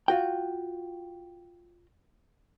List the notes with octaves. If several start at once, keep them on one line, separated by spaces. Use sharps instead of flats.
F4 F#4 G5